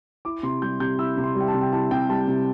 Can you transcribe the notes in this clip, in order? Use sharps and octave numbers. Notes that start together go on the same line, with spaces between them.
E4 D6
C3 C6
G3 G6
C3 G6
E4 E6
C3
C6
G3
G5
A5
C3
G5
E4 A5
C3 G5
G3 A5
C3